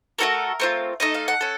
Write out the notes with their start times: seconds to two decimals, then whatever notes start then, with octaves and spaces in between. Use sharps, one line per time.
0.19 A3 C#4 F#4 A4 A#4
0.60 A3 C4 F4
1.00 A3 D#4 A4 D#5
1.14 F5
1.28 F#5
1.41 C#4 A4